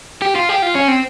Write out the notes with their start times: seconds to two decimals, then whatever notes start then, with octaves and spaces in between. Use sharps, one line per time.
0.22 G4
0.36 F4
0.49 G4
0.62 F4
0.75 C#4
0.88 C4